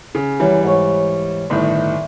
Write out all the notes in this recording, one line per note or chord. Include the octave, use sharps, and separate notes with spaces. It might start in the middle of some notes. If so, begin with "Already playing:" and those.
C#3
F#2 E3 G3
G#2 C#5
G1 A2 D#3 D5 E5